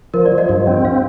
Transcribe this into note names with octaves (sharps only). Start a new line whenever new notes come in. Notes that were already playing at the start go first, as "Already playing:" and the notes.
F3 A#4
D5
F3
D#5
G2
C4
F5